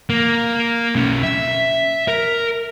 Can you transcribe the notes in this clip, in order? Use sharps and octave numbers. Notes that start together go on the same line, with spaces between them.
A#3
B1 C#4
E5
A#4